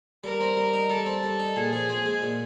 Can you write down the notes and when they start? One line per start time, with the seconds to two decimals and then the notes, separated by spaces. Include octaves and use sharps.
0.24 G3 A#4
0.41 C4
0.57 G3
0.74 D#4
0.90 G3 A4
1.06 C4
1.23 G3
1.39 D#4
1.56 A#2 G#4
1.73 F3
1.89 C4
2.06 G#3
2.22 A#2